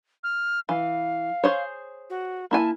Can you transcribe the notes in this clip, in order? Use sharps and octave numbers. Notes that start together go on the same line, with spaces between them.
F6
E3 F5
G#4 C5 C#5
F#4
A#3 E4 G#5 A5